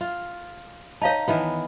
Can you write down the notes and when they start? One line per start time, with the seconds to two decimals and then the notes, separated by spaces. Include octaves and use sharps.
0.01 F4
1.01 D#4 C#5 D#5 F5 A5
1.28 D#3 E3 B3